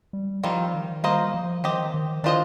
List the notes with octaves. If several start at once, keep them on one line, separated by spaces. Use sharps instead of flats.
G3
D#3 F3 G3 C4 F4
D#3
G3 A#3 F4 C5 D#5
F3
D#3 C4 G4 C5 D#5
D#3
D#3 D4 F4 C5 D#5